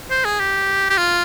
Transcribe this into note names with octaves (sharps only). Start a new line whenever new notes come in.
C5
G#4
G4
G4
F4